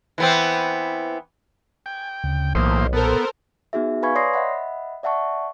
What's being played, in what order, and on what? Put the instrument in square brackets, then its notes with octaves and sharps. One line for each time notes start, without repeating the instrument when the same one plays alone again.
[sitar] E3 B3 C4
[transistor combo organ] G5 [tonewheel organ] G#5
[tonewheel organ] D2 C#3
[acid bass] B1 [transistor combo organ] A2 A#3 C5 [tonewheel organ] E3 D#6
[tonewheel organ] A#2 [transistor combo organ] B3 [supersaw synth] A4 A#4 C5
[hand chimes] B3 D#4 F#4 G#4 E5
B4 F5 G#5 B5 C#6 G#6
C#5 D5 C6 D#6 A#6 C7
D#5 E5 F#5 B5
D5 E5 F#5 A5 C#6